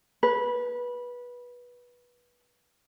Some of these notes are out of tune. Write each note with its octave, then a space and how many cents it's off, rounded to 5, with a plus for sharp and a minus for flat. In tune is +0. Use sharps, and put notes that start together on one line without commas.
B4 -20